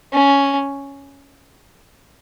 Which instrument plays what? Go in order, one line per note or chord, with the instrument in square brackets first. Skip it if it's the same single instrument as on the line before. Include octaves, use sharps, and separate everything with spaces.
[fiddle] C#4